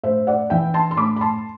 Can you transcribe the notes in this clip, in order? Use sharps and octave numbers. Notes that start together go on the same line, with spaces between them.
A2 C5 E5
D5 F#5
E3 E5 G5
A5 C6
C6
A2 B5 D6
B5
A5 C6